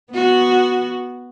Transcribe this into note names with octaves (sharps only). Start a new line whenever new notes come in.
B3 F#4